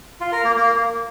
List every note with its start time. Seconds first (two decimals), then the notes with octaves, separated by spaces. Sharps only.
0.20 F4
0.32 A#4
0.44 A#3
0.56 A#3